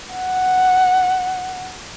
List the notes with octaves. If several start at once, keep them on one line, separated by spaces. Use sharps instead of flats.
F#5